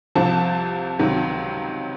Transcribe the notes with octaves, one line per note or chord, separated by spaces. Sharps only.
C2 C3 F3 A5
C#2 C3 D#3 F#3